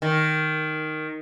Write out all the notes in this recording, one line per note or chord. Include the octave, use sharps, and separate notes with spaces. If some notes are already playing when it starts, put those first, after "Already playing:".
D#3